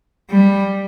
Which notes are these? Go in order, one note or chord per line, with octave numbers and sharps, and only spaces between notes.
G3